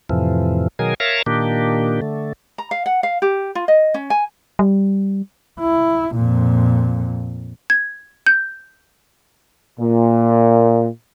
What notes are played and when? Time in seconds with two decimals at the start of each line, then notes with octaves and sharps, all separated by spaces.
0.09 F2 A2 C3 E3 F3
0.79 B2 D#3 F#3 G#4 A#4 G#5
1.00 A#4 C#5 E5 F5 A5 A#5
1.26 A#2 D#3 A#3 D4 G4
2.01 D3 A3
2.58 A#5
2.71 F5
2.86 F#5
3.03 F5
3.22 G4
3.55 F4
3.68 D#5
3.94 C#4
4.10 G#5
4.59 G3
5.60 E4
6.16 F2 A#2
7.70 G#6
8.27 G6
9.79 A#2